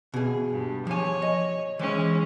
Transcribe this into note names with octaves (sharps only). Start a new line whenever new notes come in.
B2 G#4
G2
F3 C#5 G#5
D#5
E3 G#3 C#4